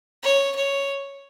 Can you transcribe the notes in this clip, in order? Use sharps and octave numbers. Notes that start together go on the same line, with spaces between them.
C#5
C#5